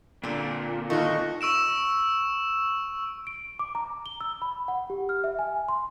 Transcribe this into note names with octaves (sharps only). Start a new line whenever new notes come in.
A#2 D3 C4
D#3 A3 F4 F#4 D#5 C#6
C#6 E6 D7 E7
D7
D6
A#5
G7
E6
B5
F#5
G4
F6
E5
G#5
C6